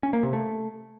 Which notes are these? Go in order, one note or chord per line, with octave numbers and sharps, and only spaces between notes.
C#4
A#3
C3
A3